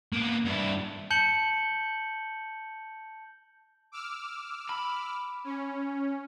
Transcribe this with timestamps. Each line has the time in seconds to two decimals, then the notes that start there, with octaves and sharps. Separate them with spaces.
0.13 A#3 B3
0.46 G2 E4
1.10 A5 G6 C#7 F#7 G7
3.92 D6 E6 F6
4.69 B5
5.44 C#4